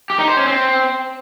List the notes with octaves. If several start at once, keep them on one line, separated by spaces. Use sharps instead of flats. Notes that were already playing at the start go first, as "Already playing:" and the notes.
G4
D#4
C5
C#4
C4